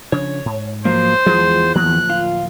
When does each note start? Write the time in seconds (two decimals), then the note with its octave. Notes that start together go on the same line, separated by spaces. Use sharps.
0.12 C#3 F3 D4 C#5
0.45 G#2
0.85 F3 F#3 A#3 C5
1.26 E2 F3 G#3 F4 G#4
1.75 D1 E2 F3 A#3 F#6
2.10 F4